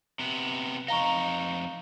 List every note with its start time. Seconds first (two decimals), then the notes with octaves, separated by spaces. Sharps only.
0.19 C3 B3
0.88 F2 D#4 F5 A#5 C#6